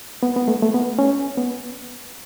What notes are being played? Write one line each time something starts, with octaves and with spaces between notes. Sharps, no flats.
B3
B3
A3
A3
B3
C#4
B3